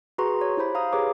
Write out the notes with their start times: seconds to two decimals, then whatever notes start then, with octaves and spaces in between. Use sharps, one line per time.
0.18 F#4 G#4 B4 A#5 C6 C#6
0.41 C#5
0.57 E4 G4 C5 B5
0.75 F5 A#5 D#6
0.93 G4 G#4 B4 C#5 A#5 D6